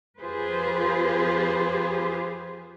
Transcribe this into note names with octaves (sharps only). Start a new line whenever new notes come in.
F2 F4 G4 G#4 B4 C5